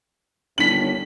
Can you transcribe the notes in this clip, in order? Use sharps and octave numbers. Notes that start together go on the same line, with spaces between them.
G1 D#2 C#4 D4 B6 F#7